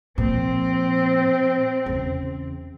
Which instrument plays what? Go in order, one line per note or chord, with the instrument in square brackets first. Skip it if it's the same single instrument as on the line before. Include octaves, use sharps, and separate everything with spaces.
[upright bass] A#2 F3 [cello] C4
[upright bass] E2 C#3